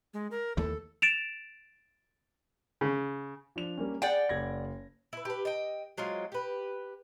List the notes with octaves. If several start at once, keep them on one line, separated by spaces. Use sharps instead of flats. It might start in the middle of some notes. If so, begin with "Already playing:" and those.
G#3
A#4
D#2 E3 A3 A4
A6 D7 E7 F7
C#3
F3 D4 F7
G3 A#3 C#4
G#4 D5 F#5 G5
F#1 G#6 A#6
E4 B4
G4 B4
D#5 G5
F#3 G#3 C4 F4
G4 B4